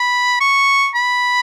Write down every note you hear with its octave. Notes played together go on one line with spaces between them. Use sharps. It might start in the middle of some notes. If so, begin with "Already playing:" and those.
Already playing: B5
C#6
B5